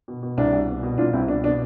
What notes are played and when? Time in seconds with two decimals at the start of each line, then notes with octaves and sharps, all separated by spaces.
0.08 B2
0.23 B2
0.37 C2 D4
0.53 C2
0.68 B2
0.83 B2
0.98 C2 D4 F4
1.13 C2 C4 E4
1.28 B2 D4
1.44 B2 D4